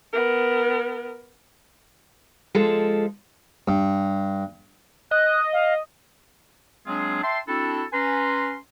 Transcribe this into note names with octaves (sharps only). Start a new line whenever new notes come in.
B3 A#4
F3 G#3 A4
G2
D#5 F#6
F5
F#3 G#3 C4 D4 F4 G#4
E5 G5 A5 C6
C4 D4 E4 F#4 A4
C#4 B4 G#5 A#5 C6